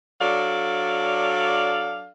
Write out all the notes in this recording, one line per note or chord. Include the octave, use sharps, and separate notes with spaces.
F#3 D4 A4 D5 F5